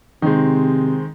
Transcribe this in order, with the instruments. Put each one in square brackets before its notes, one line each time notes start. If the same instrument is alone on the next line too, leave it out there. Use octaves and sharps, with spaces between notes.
[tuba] C3 [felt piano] D#3 [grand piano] G#3 C4 D#4